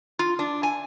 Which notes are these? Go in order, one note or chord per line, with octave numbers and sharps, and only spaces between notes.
F4
D4
G#5